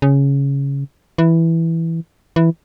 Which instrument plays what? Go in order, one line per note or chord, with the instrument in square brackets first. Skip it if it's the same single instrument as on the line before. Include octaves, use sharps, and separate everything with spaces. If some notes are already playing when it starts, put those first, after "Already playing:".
[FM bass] C#3
E3
E3